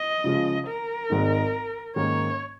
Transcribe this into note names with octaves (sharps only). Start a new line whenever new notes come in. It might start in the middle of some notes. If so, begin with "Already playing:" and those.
Already playing: D#5
C#3 F3 G#3 F4
A#4
G#1 G#2 D#3 G#3 D#4
G#2 D#3 A#3 C#4 C#5